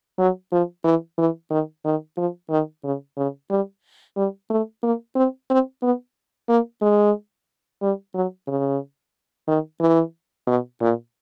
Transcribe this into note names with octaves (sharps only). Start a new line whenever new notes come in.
F#3
F3
E3
E3
D#3
D#3
F3
D#3
C#3
C#3
G3
G3
A3
A#3
C4
C4
B3
A#3
G#3
G3
F#3
C#3
D#3
E3
B2
A#2